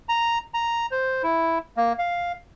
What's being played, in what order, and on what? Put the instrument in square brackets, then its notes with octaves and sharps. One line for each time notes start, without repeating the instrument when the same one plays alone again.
[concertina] A#5
A#5
C5
E4
A#3
F5